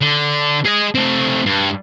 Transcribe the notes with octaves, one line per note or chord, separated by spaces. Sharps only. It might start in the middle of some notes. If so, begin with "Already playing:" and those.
D3
G#4 D#5
A3 C4
G2